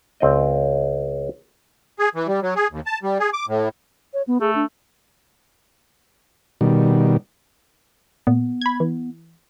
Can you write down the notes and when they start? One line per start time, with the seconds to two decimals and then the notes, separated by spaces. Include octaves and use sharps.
0.20 C#2 C4 D5 D#5
1.99 G#4
2.15 E3
2.28 G3
2.42 F#3
2.56 G#4
2.71 D#2
2.86 A5
3.03 G3
3.19 G#4
3.33 D6
3.48 A2
4.14 C#5
4.27 B3
4.41 A3 G#4
4.55 D4
6.61 B2 D#3 G3
8.27 A#2 B3
8.61 B5 G#6
8.80 E3